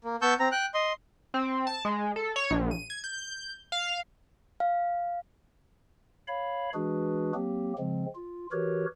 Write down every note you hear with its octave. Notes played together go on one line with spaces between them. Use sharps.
A#3
B3 A5 C#6 E6 G6
C4 A#5
G5 F#6
D#5 C6
C4
A5
G#3
A4
C#5
A#1
D#7
G#6
G6
F5
F5
C#5 F5 B5
E3 G#3 D4 F#4 G#4 B4
F#3 A#3 C4 G4
C#3 F3 G#3 C4
F4
E3 F#4 G4 A#4 B4 C#5